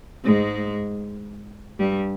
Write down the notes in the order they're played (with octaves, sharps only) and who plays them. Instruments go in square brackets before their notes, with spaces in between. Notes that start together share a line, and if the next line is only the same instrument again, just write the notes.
[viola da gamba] G#2 G#3
G2 G3